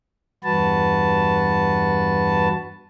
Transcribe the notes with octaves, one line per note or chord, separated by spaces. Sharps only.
E2 G2 F#4 B4 A5